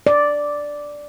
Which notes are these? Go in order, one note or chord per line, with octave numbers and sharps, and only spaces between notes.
D5